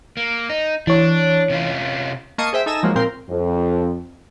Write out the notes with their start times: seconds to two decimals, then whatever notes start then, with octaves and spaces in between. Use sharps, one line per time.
0.17 A#3
0.49 D#4
0.87 E3 D4 C#5
1.50 C3 C#4 F4
2.38 A#3 D#5 A5 C#6 C7 D#7
2.53 G#4 C5 E5 G5
2.66 D#4 A4 G#5 E6 A#6 E7
2.83 F3 F#3 G#3 A#3
2.96 A#2 C4 A#4 C6
3.30 F2